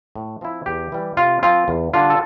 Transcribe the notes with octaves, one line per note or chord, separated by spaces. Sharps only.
A2
F3 C4 E4
E2 G4
E3 G3
C3 F4
F3 C4 F4
E2
D3 G3 D4 F4
A4